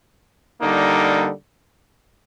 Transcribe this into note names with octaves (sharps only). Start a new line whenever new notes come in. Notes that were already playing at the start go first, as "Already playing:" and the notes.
D3 G3 A#3 D#4